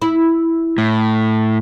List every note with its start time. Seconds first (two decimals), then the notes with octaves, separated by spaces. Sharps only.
0.02 E4
0.78 A2